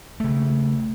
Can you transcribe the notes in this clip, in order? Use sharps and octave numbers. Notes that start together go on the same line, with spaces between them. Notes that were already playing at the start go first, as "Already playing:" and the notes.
C#3 A3